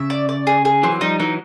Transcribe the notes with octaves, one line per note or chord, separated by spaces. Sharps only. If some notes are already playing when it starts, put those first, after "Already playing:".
Already playing: C#3 E5
D5
D5
G#4
G#4
E3 F#3 C4
F3 G3 D#4
E3 F#3 D#4